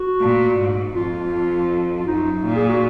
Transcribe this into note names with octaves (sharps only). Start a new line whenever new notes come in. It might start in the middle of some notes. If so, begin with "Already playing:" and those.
Already playing: F#4
A#2
G#2
F2 F4
F4
F#2 D#4
A#2
G#4
F#4